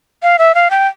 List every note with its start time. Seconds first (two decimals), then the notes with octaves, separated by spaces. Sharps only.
0.23 F5
0.39 E5
0.55 F5
0.71 G5